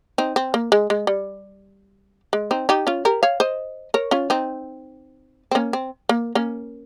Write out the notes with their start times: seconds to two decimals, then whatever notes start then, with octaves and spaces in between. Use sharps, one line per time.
0.18 C4 D#4
0.36 C4
0.54 A#3
0.72 G#3
0.90 G#3
1.07 G3
2.33 G#3
2.51 C4 D#4
2.69 D#4 G4
2.87 C#4 F4
3.05 G4 A#4
3.23 C#5 F5
3.40 C5 D#5
3.94 A#4 C#5
4.11 C#4 F4
4.30 C4 D#4
5.51 C4
5.55 A#3 C#4
5.73 C4
6.09 A#3
6.35 A#3 C#4